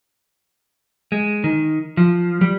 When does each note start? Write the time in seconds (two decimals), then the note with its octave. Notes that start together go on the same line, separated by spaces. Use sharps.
1.12 G#3
1.44 D#3
1.97 F3
2.41 G3